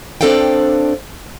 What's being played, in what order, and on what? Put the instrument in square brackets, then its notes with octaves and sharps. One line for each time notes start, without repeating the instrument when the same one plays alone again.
[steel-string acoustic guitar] C4 D4 A4 D5 F5 G5